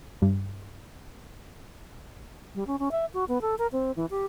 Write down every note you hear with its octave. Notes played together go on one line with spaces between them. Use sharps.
G2
G3
C#4
C#4
E5
F#4
B3
A4
A#4
C4
E3
G4